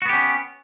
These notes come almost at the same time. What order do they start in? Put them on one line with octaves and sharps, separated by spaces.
F#4 B3 G4 C#4